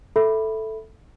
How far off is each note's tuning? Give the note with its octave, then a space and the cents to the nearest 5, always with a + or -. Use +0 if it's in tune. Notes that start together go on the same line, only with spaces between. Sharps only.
A4 +0 E5 +0 B5 +0